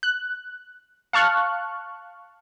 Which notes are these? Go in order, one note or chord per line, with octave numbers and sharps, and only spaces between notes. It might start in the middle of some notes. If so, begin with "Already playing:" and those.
F#6
F5 A5 C#6 F6 F#6